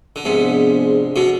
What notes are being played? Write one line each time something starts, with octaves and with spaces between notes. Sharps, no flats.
D3
G#2 C3 F3 B3 D4 G#4
B2 D3